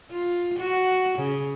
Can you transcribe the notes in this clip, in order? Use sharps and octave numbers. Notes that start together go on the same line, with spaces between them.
F4
F#4
C#3